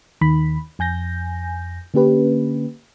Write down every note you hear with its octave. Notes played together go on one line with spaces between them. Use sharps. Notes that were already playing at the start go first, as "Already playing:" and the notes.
D#2 D#3 B5
F2 G#5 G6 A#6
D3 A#3 C#4 G4 B4